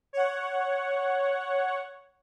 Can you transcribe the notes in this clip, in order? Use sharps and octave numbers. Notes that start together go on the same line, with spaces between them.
C#5 F#5